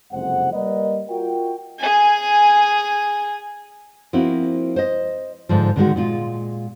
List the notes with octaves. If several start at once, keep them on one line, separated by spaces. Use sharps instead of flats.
F#1 F2 C3 G#3 C5 F#5
G3 A#3 A#4 B4 D5 D#5
F4 F#4 A#4 G5
G#4 G#5
F3 A#3 C4 E4 F#4
C5 D#5
G#2 D3 F3
D3 D#3 G#3 F#4
A#2 G#3 F4